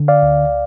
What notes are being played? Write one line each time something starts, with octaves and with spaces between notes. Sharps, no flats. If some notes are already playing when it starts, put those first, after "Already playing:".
Already playing: D3
D5 F5
D2